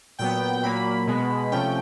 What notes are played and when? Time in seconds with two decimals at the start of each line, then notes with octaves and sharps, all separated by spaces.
0.19 A#2 F#3 B3 G5
0.63 A#2 F#3 A#3 B5
1.07 B2 G#3 B3
1.52 C3 F3 A3 C#4 G5